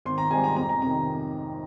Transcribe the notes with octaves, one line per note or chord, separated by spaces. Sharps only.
G#1 C6
A#5
G#2 G3 C4 G#5
A#5
F2 A#5
A#5
C3 D#3 A#5